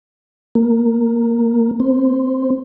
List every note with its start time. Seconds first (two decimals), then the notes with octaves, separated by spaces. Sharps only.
0.55 A#3
1.80 C4